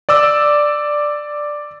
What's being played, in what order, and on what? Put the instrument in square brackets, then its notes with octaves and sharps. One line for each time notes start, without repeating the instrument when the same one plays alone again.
[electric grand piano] D5 D6 E6